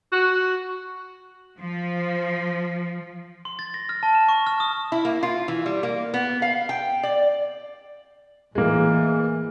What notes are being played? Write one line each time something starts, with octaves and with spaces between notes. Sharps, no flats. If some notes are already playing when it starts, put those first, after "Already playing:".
F#4
F3
C6
A6
A#6
F6
A5
E7
C#6
F6
D#6
E4
A#3
F4
E3
G3
A#3
B3
F5
G5
D5
A2 E3 G#3 A#3